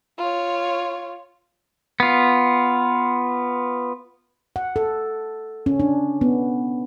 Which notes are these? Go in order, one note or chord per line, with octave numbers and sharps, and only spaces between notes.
F4 C#5
B3 F4
F#5
A4
C#4
D4
B3